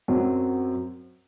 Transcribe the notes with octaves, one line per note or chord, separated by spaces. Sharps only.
F#2 F#3 C4